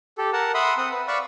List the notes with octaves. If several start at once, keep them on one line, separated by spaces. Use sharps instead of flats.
G4 A4
A#4 F#5 A5
E5 F#5 B5 C6 D#6
C4 F#5 D#6
B4
D5 F5 B5 C#6 E6 F#6